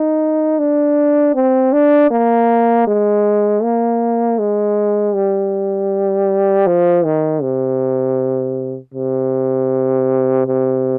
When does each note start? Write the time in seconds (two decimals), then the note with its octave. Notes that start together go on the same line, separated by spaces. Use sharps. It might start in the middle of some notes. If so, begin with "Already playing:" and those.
Already playing: D#4
0.59 D4
1.35 C4
1.73 D4
2.11 A#3
2.87 G#3
3.63 A#3
4.39 G#3
5.15 G3
6.67 F3
7.05 D#3
7.42 C3
8.94 C3
10.46 C3